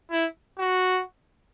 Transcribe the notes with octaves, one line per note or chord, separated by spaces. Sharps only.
E4
F#4